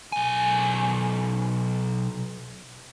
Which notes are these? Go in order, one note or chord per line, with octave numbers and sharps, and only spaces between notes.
B1 G#5